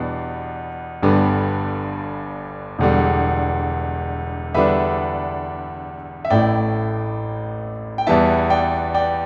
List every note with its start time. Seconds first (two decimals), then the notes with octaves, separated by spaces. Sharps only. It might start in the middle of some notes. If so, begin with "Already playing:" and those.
Already playing: E2 B2 G3 B3 D4
1.02 G1 G2 D3 G3 B3
2.79 E1 E2 D3 G3
4.54 E2 D3 G3 D4 B4 E5
6.25 E5
6.30 A1 A2 A3 E4 D5 G5
7.98 G5
8.07 E2 E3 G3 B3 E4 E5 A5
8.50 D5 G5
8.94 D5 G5